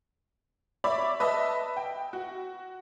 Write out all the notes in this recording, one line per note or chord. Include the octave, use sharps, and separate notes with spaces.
C#5 D5 E5 B5
B4 D#5 E5 A5
G5
F#4